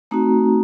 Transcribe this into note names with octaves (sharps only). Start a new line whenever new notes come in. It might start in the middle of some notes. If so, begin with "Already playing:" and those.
A3 C4 D#4 F#4 A#5